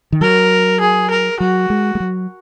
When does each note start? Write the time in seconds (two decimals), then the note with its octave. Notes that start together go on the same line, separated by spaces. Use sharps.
0.12 D#3
0.21 F#3 A#4
0.81 G#4
1.10 A#4
1.40 F#3 F#4
1.70 G#3
1.95 G#3
2.00 F#3